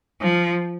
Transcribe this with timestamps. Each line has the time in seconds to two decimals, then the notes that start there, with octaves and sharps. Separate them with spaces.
0.21 F3